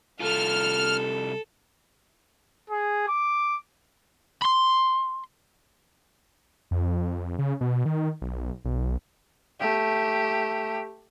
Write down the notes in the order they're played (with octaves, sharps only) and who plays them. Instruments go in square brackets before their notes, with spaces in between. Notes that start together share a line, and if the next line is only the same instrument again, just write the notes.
[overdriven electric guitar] C2 F4 [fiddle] A4 [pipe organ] F6
[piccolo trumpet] G#4
D6
[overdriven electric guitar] B5 C6
[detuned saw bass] F2
C#3
B2
D#3
B1
B1
[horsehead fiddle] A3 G4